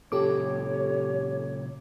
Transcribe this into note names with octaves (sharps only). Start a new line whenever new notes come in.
A#2 C#3 F#3 G4 A4 C#5 D6